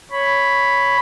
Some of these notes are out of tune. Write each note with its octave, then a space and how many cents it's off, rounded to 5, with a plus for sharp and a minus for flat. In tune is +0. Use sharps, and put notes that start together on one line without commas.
C#5 +0 B5 +0